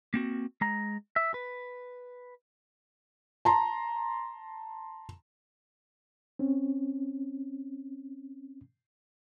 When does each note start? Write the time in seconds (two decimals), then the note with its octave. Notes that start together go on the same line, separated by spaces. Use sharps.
0.14 A#3 C4 F#4
0.61 G#3 A#5
1.16 E5
1.34 B4
3.45 A5 A#5 C6
6.39 C4 C#4